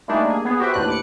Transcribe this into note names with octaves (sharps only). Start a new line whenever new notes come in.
G3 A3 A#3 D4 D#4 G#4
A#3 G#4
B3 G#4
F#4 G4 B4 C5 E5 G5
D#2 A2 D4 B4 F#6
D6 F#6 C#7